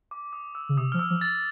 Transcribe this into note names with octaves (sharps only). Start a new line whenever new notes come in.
D6
D#6
E6
C#3
C3 D#6
F3 F6
E6
F3
A6